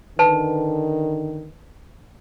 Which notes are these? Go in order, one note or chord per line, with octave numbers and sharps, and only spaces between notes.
D3 D#3 B4 A5